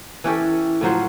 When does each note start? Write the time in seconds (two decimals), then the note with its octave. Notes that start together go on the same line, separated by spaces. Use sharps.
0.24 E3 C#4 G4 A4
0.81 A2 F3 F#3 C5